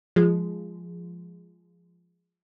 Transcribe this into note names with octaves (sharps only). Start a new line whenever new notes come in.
F3 G#3